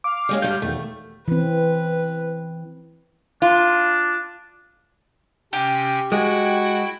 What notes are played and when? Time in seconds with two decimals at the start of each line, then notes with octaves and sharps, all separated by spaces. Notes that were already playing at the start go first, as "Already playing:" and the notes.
0.04 F5 D6 F6
0.29 G3 G#3 C#4
0.42 G2 D3 G3 G6
0.62 E2 B2 D#3 A3
1.28 E3 C4 B4
3.42 D4 F4
5.53 C3 C#4 G4 G5
6.12 G#3 E4 F#4 G5